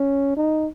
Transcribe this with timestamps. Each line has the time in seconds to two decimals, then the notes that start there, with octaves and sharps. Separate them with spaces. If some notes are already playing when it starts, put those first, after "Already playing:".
Already playing: C#4
0.37 D#4